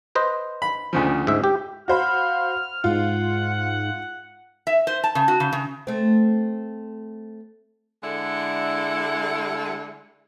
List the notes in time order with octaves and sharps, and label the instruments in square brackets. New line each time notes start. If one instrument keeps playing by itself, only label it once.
[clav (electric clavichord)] B4 C5 D#5
[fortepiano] B5
D2 C#3 F3
[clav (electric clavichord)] G#2 E5
G4
[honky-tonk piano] F#4 C5 B5 [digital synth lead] F5 [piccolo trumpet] F6
[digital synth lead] G#2 [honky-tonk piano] F4 [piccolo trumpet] F#5
[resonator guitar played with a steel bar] E5
C5
A5
C#3
F#4
C#3
C#3
[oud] A3 C4
[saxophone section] D3 G#3 D4 E4 A4 F#5